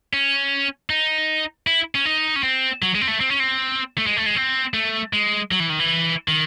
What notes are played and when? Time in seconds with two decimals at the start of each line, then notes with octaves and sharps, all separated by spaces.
0.13 C#4
0.90 D#4
1.67 E4
1.95 C#4
2.05 D#4
2.36 C#4
2.43 C4
2.82 F#3
2.95 G#3
3.01 C4
3.08 A3
3.21 C4
3.30 C#4
3.40 C4
3.98 A3
4.07 G#3
4.17 A3
4.26 G#3
4.36 C4
4.74 A3
5.13 G#3
5.51 F#3
5.60 E3
5.69 D#3
5.79 E3
6.28 D#3